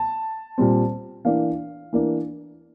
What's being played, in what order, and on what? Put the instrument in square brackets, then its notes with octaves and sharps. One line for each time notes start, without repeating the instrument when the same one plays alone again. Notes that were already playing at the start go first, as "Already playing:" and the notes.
Already playing: [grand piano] A5
A#2 G3 C4
E3 A#3 D4 F5
E3 A#3 D4